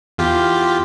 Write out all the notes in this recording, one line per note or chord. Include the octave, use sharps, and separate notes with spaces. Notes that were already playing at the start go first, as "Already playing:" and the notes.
E2 F4 G4